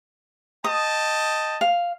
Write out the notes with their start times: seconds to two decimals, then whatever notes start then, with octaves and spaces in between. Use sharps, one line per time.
0.64 D#5 G5 A5 D#6
1.61 F5